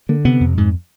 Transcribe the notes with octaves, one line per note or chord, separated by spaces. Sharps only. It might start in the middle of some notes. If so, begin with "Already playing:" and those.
D3 A#3
C3 B3
F2
G#2